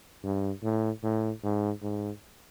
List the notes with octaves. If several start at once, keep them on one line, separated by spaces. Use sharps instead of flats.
G2
A2
A2
G#2
G#2